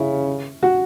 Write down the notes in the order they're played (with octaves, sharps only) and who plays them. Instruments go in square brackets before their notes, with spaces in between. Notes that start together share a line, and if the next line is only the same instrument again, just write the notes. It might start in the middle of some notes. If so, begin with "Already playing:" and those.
Already playing: [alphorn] C#3 [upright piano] C#4 E4
[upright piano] F#4